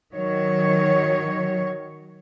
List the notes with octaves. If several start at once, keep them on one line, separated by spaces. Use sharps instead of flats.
D#3 F#3 C#5